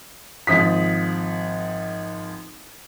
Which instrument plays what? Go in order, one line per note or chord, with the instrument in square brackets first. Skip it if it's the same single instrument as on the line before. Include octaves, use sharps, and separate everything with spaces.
[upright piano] G#1 F3 D#6 B6